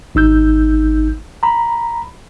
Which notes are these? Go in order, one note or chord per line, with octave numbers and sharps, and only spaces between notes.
G#1 D#4 E6 G6
A#5 B5